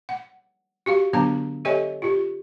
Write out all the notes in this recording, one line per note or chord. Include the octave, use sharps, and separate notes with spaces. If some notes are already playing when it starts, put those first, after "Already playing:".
F#5
F#4 G4 F5
D3 F#3 B3 D4 F5 A#5
G4 A4 C#5 D#5 E5 G#5
F4 G4